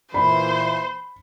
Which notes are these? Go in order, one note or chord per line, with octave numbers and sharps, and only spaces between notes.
A#2 E3 C5 B5